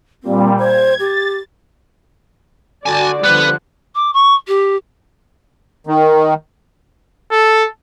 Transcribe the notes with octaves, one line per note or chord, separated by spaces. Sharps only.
A#2 G3 C4
C5 G#6
G4 A6
D3 F#4 D5 G#5 A5
D3 F3 G3 B3 B4 F#6
D6
C#6
G4
D#3
A4